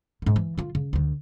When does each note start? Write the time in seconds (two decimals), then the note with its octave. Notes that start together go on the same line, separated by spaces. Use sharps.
0.22 G#2 D3
0.36 E3
0.58 D3 F4
0.75 C#3
0.93 D2 D3